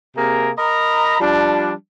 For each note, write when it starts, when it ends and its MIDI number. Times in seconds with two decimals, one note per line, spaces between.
0.15 0.51 48
0.15 0.51 58
0.15 0.51 68
0.15 0.51 70
0.58 1.20 70
0.58 1.20 75
0.58 1.20 82
0.58 1.20 83
1.21 1.72 53
1.21 1.72 55
1.21 1.72 62